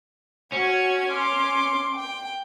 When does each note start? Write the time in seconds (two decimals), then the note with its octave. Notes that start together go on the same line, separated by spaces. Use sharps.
0.53 C#4 F#4 G#6
1.11 C6 D6
1.96 G5